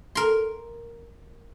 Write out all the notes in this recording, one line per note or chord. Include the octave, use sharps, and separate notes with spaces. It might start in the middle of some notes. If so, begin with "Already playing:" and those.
A#4 C6